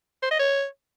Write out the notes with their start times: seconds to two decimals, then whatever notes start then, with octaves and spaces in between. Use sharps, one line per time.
0.23 C5
0.31 D#5
0.40 C#5